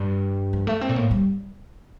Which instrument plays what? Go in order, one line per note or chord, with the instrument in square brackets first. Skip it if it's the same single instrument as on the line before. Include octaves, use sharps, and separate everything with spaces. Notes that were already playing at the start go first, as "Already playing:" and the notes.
Already playing: [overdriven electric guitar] G2
[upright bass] F3
A3
C4
[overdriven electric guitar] A#2
[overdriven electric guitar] A2 [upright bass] A#3
[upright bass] G3